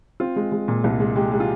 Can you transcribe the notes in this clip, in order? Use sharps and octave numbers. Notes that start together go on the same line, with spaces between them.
C4 F4
G#3
G#3
A#2
C2
G#3
G#3 G4
G#3
F4